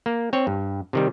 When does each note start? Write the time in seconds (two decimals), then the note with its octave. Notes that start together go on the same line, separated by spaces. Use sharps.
0.06 A#3
0.33 C4 C#5
0.47 G2
0.93 C3 D#3 G3